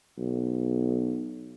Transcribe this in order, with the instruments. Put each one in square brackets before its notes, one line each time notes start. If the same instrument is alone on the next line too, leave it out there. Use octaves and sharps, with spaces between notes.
[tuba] B1